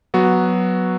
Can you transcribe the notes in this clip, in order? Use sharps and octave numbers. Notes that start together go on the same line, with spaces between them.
F#3 B3 F#4